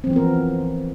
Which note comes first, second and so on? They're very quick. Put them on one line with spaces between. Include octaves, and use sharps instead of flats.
C4 F3 E3 B3 A#4